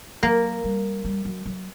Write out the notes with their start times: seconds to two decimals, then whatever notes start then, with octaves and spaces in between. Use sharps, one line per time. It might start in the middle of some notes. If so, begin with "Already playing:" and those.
0.23 F#3 A#3
0.64 G3
1.05 G3
1.25 F#3
1.46 F#3